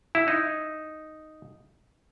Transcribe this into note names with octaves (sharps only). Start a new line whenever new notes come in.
E4
D#4